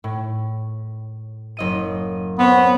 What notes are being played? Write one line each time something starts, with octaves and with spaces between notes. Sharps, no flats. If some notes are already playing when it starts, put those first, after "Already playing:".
A2
F#1 D#5 D#7
B3 C4 C#5